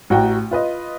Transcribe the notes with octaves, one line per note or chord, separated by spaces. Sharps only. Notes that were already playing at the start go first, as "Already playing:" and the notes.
A1 F#4 G5 A#5
F4 B4 D#5